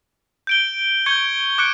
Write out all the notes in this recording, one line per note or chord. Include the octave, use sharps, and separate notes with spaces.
G6 D7 G7
C#6 G6 G#6 C#7 G7
D6 F#6 C#7 D7